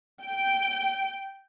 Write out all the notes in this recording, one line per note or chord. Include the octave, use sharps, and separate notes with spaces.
G5